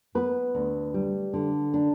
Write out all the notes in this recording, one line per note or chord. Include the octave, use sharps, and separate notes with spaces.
B3 B4
D2
G3
D3
D4